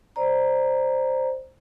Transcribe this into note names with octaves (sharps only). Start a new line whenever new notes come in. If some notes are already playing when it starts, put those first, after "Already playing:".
C5 D5 A#5